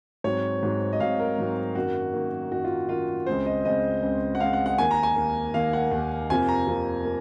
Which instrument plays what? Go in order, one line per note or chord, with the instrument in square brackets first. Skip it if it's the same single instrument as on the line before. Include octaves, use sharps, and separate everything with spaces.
[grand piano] G#2 F#3 C4 C#5
G#2 F#3 C4
D#5
G#2 F#3 C4 F5
A#4
G#2 F#3 C4
F#2 D#3 A#3 F#4
F#2 D#3 A#3
F#2 D#3 A#3 F#4
F4
F#2 D#3 A#3 F4
C#2 C#3 G#3 C4 C5
D#5
C#2 C#3 G#3 C4 D#5
C#2 C#3 G#3 C4
F#5
C#2 C#3 G#3 C4 F5
F#5
F#5
D#2 D#3 A#3 G#5
A#5
G#5
D#2 D#3 A#3
D#2 D#3 A#3 F5
F#5
D#2 D#3 A#3
F2 C3 F3 A#3 G#5
A#5
F2 C3 F3 A#3
A#3